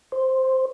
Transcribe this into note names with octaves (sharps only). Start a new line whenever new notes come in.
C5